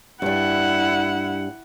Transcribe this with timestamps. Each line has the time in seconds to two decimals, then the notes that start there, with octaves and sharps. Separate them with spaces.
0.22 G2 G3 E4 F#5